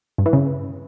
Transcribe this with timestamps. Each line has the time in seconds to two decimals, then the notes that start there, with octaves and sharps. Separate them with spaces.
0.18 G2
0.26 E3
0.33 C#3